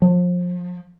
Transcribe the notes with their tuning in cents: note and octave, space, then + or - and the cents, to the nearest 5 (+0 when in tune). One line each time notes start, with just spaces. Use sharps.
F3 +30